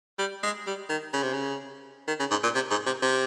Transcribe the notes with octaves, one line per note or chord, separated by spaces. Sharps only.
G3
G#3
G3
D#3
C#3
C3
C#3
D#3
C#3
G#2
A#2
C3
G#2
C3
C3